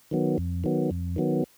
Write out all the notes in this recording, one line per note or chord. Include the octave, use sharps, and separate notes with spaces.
D#3 F#3 B3
F2
D#3 F#3 B3
F2
D#3 F#3 B3